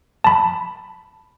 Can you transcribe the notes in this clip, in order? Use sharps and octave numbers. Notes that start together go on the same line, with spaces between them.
A5 B5